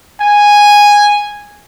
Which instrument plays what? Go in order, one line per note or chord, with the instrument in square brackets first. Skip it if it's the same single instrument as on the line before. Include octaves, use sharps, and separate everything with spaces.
[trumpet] G#5